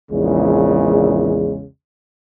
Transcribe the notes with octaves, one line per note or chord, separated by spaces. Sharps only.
A#1 E2 C#3 G#3